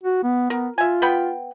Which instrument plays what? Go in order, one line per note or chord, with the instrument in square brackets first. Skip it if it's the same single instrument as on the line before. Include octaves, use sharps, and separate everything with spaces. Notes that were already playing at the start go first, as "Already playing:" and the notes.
[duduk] F#4
B3
[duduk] B3 [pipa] A#4
[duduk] F4 [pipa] E5 G#5
[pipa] B3 G5 B5